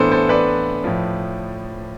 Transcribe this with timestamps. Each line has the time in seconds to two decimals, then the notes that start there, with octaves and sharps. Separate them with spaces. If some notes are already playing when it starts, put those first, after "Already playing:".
Already playing: A2 E3 B3 D4 A4 C5
0.12 A4 C5
0.29 B4 D5
0.84 A2 F3